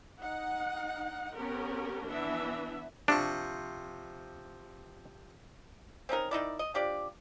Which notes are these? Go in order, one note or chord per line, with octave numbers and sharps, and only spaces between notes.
D#4 F#5
B3 C#4 G4 A#4
E3 B3 D4 E5
C3 F3 D4 C#6
C4 C#4 D#4 A#4
D#3 D#4 E4 D5
D#5
F3 D4 G4 D5